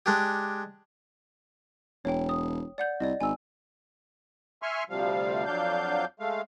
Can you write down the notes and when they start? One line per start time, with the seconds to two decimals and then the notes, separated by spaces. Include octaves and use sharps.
0.06 G#3 D4 G4
2.05 E1 C#5 G5
2.29 D#6
2.78 D5 F#5 G6
3.00 C2 D5 D#5
3.21 G#1 G#5 E6
4.62 E5 G#5 C6 C#6 F6
4.90 D2 C3 F3 G3 F5
5.46 F2 F#3 D4 F5 G6
6.20 G#3 A3 F5